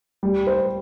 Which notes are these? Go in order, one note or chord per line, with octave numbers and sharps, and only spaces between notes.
G3
C5